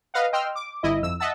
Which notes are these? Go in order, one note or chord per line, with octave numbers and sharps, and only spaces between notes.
B4 D#5 F5 F#5
D#5 G5 C6 E6 F6
D6
G1 E4 D#5
F2 E6
D#5 E5 F#5 A5 E6